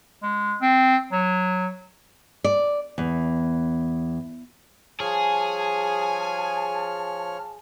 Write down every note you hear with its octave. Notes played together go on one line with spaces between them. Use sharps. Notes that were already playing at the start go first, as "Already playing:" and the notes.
G#3
C4
F#3
D5
E2
F3 G3 G#4 C#5 G#5 A5 F6